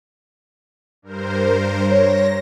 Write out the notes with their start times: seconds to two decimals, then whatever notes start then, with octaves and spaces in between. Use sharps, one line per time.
1.02 G2 A#4 C5
1.90 C#5 A#6